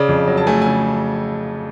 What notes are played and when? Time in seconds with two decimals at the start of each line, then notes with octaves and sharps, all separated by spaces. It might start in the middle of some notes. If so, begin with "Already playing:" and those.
Already playing: C#3 D5
0.09 F2
0.28 F#3
0.37 A5
0.47 A3 G#5
0.62 C#3 G#5